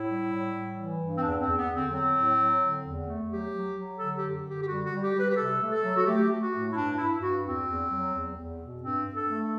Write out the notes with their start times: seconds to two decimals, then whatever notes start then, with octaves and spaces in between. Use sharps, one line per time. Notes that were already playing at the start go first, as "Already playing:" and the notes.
Already playing: A2 E4
0.08 G3
0.31 A2
0.54 G3
0.78 E3
1.00 G2
1.18 C4
1.23 E2 D4
1.41 E2 C4
1.58 B3
1.69 D3
1.75 C4
1.92 F#3 C4
2.16 A2
2.39 F#3
2.61 D3
2.85 E2
3.07 A3
3.30 F#3 G4
3.54 F#3
3.77 F#3
3.99 D3 A4
4.17 G4
4.23 F#2
4.46 D3 G4
4.63 G4
4.68 G3 F#4
4.85 F#4
4.91 G3
5.03 G4
5.14 G3
5.20 B4
5.31 G4
5.37 C3 A4
5.60 A3
5.72 A4
5.83 F#3
5.97 F#4
6.06 A3 G4
6.30 A3
6.41 F#4
6.52 A2
6.72 E4
6.75 G2 D4
6.98 G2 E4
7.21 G2 F#4
7.44 E2 C4
7.67 E2
7.91 F#3
8.13 E2
8.37 E2
8.59 B2
8.82 G2 C4
9.05 G2
9.16 A4
9.28 A3